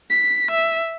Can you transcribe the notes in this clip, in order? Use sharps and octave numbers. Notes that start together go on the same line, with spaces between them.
B6
E5